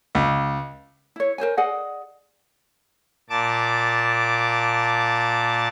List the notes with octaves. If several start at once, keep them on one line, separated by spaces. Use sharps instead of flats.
C#2
E4 C#5
A#4 C5 C#5 G#5
G#4 D5 D#5 F#5
A#2 A5 D6